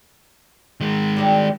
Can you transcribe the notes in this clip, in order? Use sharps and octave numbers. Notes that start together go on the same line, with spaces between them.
D#3 G#3
G3 C4 D4